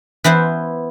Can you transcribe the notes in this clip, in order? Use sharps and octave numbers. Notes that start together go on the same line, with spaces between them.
E3 B3 E4 C5